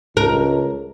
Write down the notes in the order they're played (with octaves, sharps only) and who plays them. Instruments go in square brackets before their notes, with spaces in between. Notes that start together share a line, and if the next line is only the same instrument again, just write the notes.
[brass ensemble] C#2 [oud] A#4